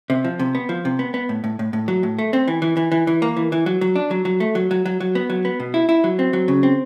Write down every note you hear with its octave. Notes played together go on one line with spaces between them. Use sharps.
C3
F3
C3
B3
F3
C3
B3
B3
A2
A2
A2
A2
F#3
A2
A3
C4
E3
E3
E3
E3
E3
A#3
E3
E3
F#3
F#3
D4
F#3
F#3
A3
F#3
F#3
F#3
F#3
B3
F#3
B3
B2
E4
E4
F#3
C4
F#3
C#3
C4